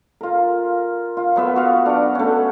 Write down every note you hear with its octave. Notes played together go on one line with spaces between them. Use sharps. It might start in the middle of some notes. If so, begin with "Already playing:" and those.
F4 A#4
F4
F#3 B3 E5
F#4 F5
D4 F#5
A3 C#4